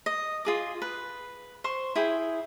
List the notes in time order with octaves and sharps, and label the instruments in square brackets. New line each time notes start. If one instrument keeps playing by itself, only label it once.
[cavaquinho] D#5
F4 G#4 D6
B4
C5 C6 C#6
E4 G#4 G5